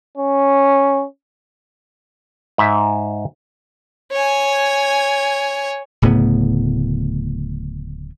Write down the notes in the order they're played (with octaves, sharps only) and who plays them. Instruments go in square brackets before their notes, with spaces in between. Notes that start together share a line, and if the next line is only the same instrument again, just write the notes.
[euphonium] C#4
[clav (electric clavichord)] G#2 E5
[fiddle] C#5 G#5
[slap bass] D1 A2 C#3 B3